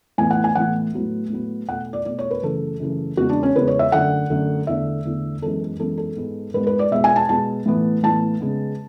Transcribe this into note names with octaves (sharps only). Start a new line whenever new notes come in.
A2 E3 B3 G#5
F#5
G#5
A2 E3 B3 F#5
A2 F#3 B3
A2 F#3 B3
B2 A3 F#5
D5
B2 A3 D5
C#5
B4
F#2 C#3 E3 A3 A4
F#2 C#3 E3 A3
E2 C#3 G#3 B3 F#4
D4
C#4
E2 C#3 G#3 B3 B4
C#5
E5
F#2 D3 A3 F#5
F#2 D3 A3
E2 D3 A3 E5
E2 D3 A3
F#2 E3 G#3 B3 A4
F#2 E3 G#3 B3 A4
A4
G#2 G#3 B3
G#2 G#3 B3 B4
B4
D5
B2 G#3 B3 E5
G#5
A5
B2 G#3 B3 A5
A2 E3 B3
A2 E3 B3 A5
C#3 G#3 B3